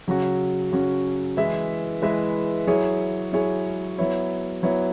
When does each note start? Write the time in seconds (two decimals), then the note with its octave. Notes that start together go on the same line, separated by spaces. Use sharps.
0.08 C#3 F#3 C#4 F#4
0.72 C#3 F#3 C#4 F#4
1.37 E3 G#3 E4 B4 E5
2.02 E3 G#3 E4 B4 E5
2.67 F#3 E4 G#4 C#5
3.33 F#3 E4 G#4 C#5
3.98 F#3 B3 E4 C#5
4.63 F#3 B3 E4 C#5